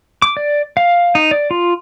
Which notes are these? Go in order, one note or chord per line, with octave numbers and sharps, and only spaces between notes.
D6
D5
F5
D#4
D5
F4